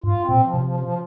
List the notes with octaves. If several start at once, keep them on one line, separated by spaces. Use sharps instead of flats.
G2 F4
C4
A#2
F3
C3
F3
F3